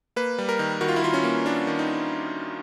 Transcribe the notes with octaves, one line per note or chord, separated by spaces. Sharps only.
A#3 B4
G3
A#4
D#3
D#3 F#4
F4
E4
D#3 F4
C#4
A#3
A#3 D4
D#3
D#4